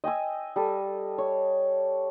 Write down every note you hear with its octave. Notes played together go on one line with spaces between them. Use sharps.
D#5 G5 G#5 E6
G3 A4
C#5